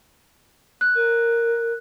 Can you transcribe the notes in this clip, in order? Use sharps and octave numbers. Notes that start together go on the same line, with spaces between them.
F#6
A#4